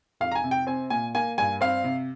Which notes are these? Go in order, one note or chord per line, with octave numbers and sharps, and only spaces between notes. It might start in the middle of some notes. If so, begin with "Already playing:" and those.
F2 F5
A#5
G#5
C3
G5
C4 G#5
A#2 G#5
A#3 G#5
G2 G#5
C4 F5
C3